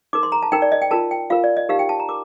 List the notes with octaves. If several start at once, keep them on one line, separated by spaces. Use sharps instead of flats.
D#4 A#4 D6
C6
A#5
A5
D#4 A#4 G5
D5
D#5
G5
F4 A#4 A5
G5
F4 A#4 F5
D5
D#5
D#4 G4 A#4 F5
G5
A5
A#5
A#4 D6